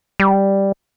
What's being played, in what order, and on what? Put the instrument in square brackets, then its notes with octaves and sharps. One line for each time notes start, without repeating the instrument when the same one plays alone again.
[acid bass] G3